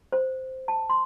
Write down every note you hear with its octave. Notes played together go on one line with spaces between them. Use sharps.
C5
A5
C6